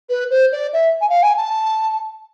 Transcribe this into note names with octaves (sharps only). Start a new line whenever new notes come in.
B4
C5
D5
E5
G#5
F5
G#5
A5